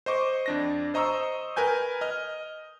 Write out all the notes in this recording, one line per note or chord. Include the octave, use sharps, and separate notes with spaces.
C5 D#5 C#6 D6
F2 D4 A#6
C5 D#5 A#5 C#6 D#6 E6
A#4 B4 G#5 G6
D#5 F6